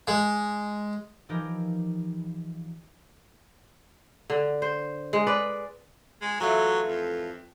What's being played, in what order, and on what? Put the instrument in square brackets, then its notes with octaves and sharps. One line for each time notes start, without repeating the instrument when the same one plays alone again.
[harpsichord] G#3
[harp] E3 F3 D#4 G4 A#4
[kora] D3
C5
G#3
B4 D5
[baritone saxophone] G#3
[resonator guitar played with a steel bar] E3 A3 F4 [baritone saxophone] F#3
[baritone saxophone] F2